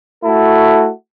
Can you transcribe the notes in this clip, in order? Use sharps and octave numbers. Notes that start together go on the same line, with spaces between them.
A3 E4 F#4 A4